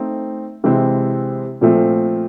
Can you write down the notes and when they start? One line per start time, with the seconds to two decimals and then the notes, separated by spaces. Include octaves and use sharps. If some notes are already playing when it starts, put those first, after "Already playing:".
Already playing: A3 C4 D#4
0.64 C3 E3 G#3 C4
1.61 A#2 F3 A3 C4